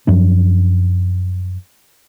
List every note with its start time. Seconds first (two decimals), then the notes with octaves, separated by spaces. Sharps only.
0.07 F#2 F3 D4